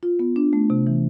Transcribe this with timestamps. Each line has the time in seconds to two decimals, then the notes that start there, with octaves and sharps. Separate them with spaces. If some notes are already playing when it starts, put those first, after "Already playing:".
0.03 F4
0.19 B3
0.36 D4
0.53 A3
0.70 C3
0.87 E3